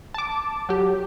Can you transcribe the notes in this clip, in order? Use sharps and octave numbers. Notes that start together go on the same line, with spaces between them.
A5 D6
F#3 G4